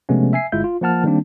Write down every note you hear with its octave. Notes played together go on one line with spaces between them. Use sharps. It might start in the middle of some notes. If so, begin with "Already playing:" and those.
C3 F3 G#3 A3 B3 C#4
E5 G#5 C7
G1 G#3 E4 F4 E5 G6
F4
F3 A#3 F#5 A5 F6
D#3 G3 A#3 C4 D4